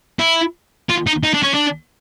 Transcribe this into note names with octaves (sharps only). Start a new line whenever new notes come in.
E4
F4
D#4
D#4
D4
C#4
D4